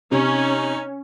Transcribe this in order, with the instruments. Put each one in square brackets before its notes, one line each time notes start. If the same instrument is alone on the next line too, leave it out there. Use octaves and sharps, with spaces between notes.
[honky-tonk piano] C3 [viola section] C#4 [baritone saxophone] D#4